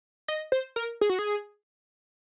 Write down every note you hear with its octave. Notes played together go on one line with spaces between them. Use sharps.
D#5
C5
A#4
G#4
F#4
G#4